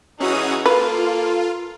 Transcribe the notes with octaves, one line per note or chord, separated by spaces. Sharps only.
E3 C#4 D#4 F#4 G#4 D#6
A#3 F4 A4 B4